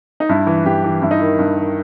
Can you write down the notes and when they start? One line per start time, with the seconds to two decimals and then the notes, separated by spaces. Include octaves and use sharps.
0.20 D#4
0.29 G2 E4
0.47 E3
0.65 G2 G4
0.84 E3
1.02 G2 E4
1.11 D#4
1.19 D#3 E4
1.39 G2
1.57 D#3